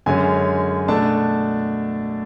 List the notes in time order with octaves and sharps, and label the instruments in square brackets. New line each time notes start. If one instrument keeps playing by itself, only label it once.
[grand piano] F#2 D3 G#3 C#4 G#5
B2 A3 D4 A5